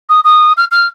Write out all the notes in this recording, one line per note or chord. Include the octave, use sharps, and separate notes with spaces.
D#6
D#6
F6
F6